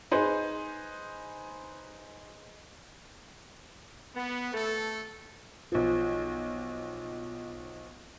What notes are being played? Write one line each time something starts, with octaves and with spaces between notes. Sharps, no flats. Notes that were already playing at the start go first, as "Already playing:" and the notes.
D#4 G#4 B4 C5
B3
A3 A4
B1 F3